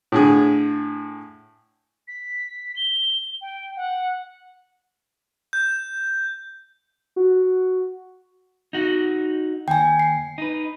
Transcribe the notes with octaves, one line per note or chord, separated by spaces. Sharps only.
A2 D3 G#4
B6
G7
G5
F#5
G6
F#4
D#4 F#4
D#2 G5 G#5
C7
D#4 B4